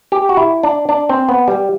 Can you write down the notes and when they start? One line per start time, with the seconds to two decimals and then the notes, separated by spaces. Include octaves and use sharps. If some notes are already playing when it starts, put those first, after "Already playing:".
0.12 G4
0.29 F#4
0.37 E4
0.63 D4
0.89 D4
1.09 C4
1.29 B3
1.48 G3